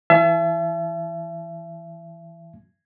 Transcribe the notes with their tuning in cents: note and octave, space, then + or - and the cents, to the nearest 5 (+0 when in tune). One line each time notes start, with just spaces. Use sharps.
E3 +0 E5 +35 A5 -40